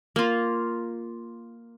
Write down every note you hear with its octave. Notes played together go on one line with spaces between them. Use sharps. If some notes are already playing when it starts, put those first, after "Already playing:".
A#3 F4